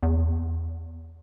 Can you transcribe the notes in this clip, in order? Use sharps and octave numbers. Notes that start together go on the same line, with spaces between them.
E2